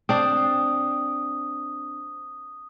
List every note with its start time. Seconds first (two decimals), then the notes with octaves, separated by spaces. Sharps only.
0.09 C4 D4 D#6